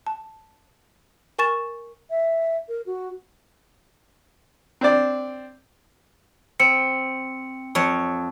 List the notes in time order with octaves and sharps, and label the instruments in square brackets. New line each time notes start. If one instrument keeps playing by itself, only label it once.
[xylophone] A5
A#4 G#5 C#6 A6 E7
[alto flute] E5
A#4
F#4
[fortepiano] C4 D4 D5
[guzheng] C4 [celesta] C#7
[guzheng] F2 C#5